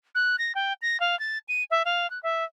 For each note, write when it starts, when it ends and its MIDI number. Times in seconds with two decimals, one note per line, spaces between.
0.15 0.36 90
0.39 0.52 94
0.55 0.73 79
0.82 1.00 94
1.00 1.18 77
1.19 1.38 93
1.48 1.63 99
1.71 1.83 76
1.85 2.10 77
2.10 2.21 90
2.23 2.44 76